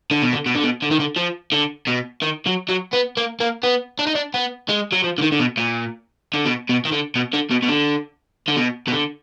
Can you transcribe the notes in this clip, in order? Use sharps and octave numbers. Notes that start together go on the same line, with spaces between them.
D3
B2
D3
B2
D3
B2
D3
D#3
D3
F3
D3
B2
D#3
F#3
F#3
B3
A#3
A#3
B3
D4
D#4
D4
B3
G#3
F#3
F3
D3
D#3
D3
B2
A#2
D3
B2
B2
D#3
D3
B2
D3
B2
B2
D3
D3
B2
B2
D3